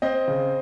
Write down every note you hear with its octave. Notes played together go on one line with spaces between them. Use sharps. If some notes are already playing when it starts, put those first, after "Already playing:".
C4 C5 D#5
C#3